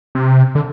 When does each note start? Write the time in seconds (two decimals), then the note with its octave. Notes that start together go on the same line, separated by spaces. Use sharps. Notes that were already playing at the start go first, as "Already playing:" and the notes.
0.15 C3
0.55 D3